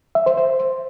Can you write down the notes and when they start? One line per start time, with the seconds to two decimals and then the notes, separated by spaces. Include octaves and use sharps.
0.15 E5
0.26 C5
0.37 C5